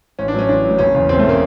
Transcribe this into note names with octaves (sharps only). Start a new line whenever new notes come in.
A1 C#4
D4
A2 F#3 C#4
A1 D4
A2 F#3
F#1 C#4
E2 C#3
F#1 C4
A3
C#3 A#3